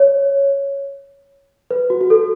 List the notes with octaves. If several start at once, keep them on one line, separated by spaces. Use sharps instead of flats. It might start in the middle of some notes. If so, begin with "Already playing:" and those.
Already playing: C#5
B4
F#4
F#4
A4